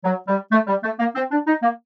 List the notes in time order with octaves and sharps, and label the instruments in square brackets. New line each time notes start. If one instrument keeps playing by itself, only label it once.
[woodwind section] F#3
G3
A3
G3
A3
A#3
C4
D4
D#4
A#3